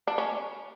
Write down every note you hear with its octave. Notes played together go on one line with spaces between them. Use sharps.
D4
C#4